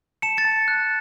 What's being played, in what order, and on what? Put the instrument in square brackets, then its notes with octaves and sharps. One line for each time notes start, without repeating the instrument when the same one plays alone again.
[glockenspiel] A5 C#7 E7
A6 C#7
A5
F#6